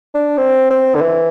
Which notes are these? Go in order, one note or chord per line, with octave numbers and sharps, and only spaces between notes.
D4
C4
C4
D3
E3